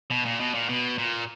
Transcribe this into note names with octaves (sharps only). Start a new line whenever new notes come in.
B2
A#2
B2
A#2
B2
A#2